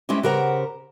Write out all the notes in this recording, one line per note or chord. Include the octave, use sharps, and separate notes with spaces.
G#3 C4 C#4 E4 G4
C#3 G4 A#4 C5 F#5 A#5